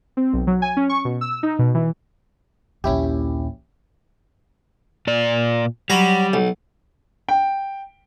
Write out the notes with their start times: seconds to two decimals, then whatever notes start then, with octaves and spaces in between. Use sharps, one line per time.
0.17 C4
0.33 B1
0.47 F#3
0.62 G#5
0.77 C#4
0.89 C#6
1.05 B2
1.21 E6
1.43 D#4
1.59 B2
1.74 E3
2.84 A#1 D#2 C#4 E4 G4
5.07 A#2 D5
5.90 F#3 G3 A#5 B5
6.33 B1
7.29 G5